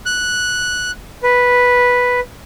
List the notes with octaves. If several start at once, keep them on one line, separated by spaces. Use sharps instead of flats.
F#6
B4